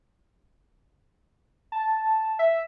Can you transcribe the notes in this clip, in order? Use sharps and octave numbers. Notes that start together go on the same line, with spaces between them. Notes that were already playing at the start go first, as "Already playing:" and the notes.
A5
E5